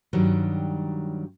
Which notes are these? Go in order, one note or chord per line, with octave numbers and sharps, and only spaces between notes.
G2 D#3 F#3 G3